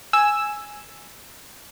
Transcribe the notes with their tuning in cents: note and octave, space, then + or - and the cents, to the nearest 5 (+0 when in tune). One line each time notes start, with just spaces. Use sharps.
G#5 +0 E6 +0